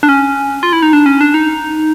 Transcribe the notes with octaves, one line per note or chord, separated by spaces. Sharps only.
D4
C#4
F4
E4
D#4
D4
C#4
D4
D#4